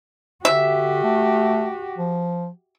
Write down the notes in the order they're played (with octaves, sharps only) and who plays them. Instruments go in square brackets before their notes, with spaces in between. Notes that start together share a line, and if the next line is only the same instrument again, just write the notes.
[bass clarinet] D3 [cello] F#4 G4 [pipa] E5
[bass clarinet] A3
F3